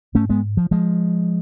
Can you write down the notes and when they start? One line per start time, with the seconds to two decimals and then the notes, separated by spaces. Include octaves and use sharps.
0.15 G#2 A3 C#4
0.30 G#3 B3
0.57 F3
0.71 F3 G#3